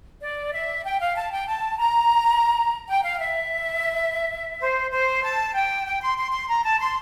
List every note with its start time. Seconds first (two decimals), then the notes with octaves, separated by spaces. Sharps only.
0.21 D5
0.52 E5
0.84 G5
0.99 F5
1.16 A5
1.31 G5
1.46 A5
1.77 A#5
2.87 G5
3.03 F5
3.19 E5
4.60 C5
4.91 C5
5.22 A5
5.54 G5
5.86 G5
6.01 C6
6.17 C6
6.32 C6
6.48 A#5
6.64 A5
6.80 C6